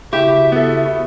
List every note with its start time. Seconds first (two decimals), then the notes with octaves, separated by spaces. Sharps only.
0.13 C#3 E4 F#4 G4 E5
0.52 B3 A4